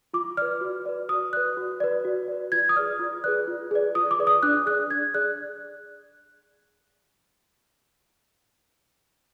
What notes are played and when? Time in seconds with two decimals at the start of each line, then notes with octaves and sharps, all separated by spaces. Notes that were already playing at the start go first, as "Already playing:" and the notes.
0.14 F4 D6
0.37 B4 D5 F6
0.61 F#4
0.86 B4 D5
1.09 F#4 D#6
1.33 B4 D5 F#6
1.57 F#4
1.80 B4 D5
2.05 F#4
2.28 B4 D5
2.52 F4 G#6
2.69 D#6
2.76 G#4 B4 D5 F6
2.99 F4
3.24 G#4 B4 D5 F#6
3.48 F4
3.71 G#4 B4 D5
3.95 F4 D#6
4.11 D6
4.19 G#4 B4 D5
4.27 D#6
4.43 D4 F#6
4.66 G#4 D5 F#6
4.91 D4 G#6
5.14 G#4 D5 F#6